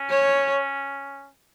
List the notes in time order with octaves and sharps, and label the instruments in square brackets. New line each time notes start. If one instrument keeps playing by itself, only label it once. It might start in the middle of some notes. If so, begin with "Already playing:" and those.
Already playing: [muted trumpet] C#4
[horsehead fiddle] C#5